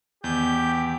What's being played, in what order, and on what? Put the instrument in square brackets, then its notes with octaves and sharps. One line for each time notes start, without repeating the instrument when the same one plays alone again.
[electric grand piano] E2 [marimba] D#3 B3 [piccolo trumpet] G4 [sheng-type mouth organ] G6